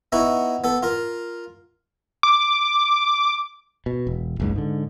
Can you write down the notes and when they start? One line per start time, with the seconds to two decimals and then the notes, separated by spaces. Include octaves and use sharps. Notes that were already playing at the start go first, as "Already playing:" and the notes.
0.12 B3 D#4 E4 F#4
0.64 B3 A4
0.83 F4 A#4
2.23 D6
3.86 B2
4.07 E1
4.40 F#1 C#2 G#2
4.56 G#2 D3